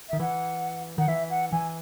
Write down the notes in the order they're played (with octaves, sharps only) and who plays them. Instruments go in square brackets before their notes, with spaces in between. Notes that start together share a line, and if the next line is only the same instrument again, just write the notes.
[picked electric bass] D#3 [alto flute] E5
[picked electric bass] E3 [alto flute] F#5
[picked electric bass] D#3 [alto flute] F#5
[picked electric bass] E3 [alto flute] E5
[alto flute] F#5
[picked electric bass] E3 [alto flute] G#5